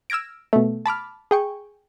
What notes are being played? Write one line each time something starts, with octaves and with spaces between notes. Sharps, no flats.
E6 F6 G#6 A#6 D7
B2 A3
A5 B5 D6 F6
G#4 G5 C#6